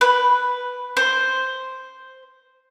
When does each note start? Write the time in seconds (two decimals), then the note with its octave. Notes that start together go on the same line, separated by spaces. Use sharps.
0.01 B4
0.97 C5